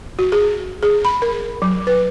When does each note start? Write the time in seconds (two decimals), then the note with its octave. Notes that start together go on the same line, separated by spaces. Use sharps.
0.19 F#4
0.32 G#4
0.83 G#4
1.05 B5
1.22 A#4
1.62 F#3
1.87 B4